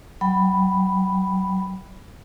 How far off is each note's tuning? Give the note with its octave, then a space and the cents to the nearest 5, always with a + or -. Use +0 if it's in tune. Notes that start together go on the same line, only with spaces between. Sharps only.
F#3 +25 G5 +0 B5 +0